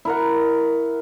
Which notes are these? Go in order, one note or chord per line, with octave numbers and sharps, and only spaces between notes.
E4 A#4 F#5